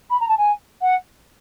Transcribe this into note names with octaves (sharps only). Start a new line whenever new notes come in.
B5
A#5
A5
G#5
F#5